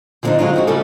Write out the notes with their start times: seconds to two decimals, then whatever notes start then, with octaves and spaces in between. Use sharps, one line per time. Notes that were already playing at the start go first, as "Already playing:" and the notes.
0.23 D3 F3 G3 C4 D4 D#4
0.39 D3 F#3 G#3 D4 F4
0.53 C4 D#4 F#4
0.67 C#3 G3 A4